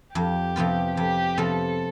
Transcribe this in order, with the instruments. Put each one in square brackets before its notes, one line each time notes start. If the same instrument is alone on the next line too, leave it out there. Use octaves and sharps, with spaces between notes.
[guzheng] F2 [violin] G4
[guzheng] C3 F3 B3 F4
[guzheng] F2 [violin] G4
[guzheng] C3 F3 B3 F4 [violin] A4